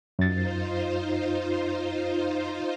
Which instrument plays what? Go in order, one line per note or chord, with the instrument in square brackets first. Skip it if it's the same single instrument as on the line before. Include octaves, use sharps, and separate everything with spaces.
[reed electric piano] F#2 A6 [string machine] D#4 F4 C5